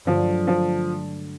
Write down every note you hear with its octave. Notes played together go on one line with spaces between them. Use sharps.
G2 D3 F3 F#3 A3
F3